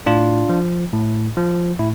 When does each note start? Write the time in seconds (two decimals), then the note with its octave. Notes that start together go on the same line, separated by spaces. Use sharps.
0.06 A2 D4 F4
0.49 F3
0.93 A2
1.37 F3
1.79 A2 E4